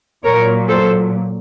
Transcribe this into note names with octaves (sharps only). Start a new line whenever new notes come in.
A#2 F#3 A#4 C#5
A4 C5